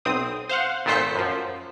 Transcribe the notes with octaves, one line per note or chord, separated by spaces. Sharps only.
B1 C4 D#6
C5 F5 F#5
G#1 A#2 A3 C5 B6 C#7
F#2 F3